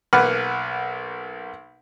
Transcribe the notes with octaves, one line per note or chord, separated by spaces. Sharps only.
B1 A#3 B4 F#5 F6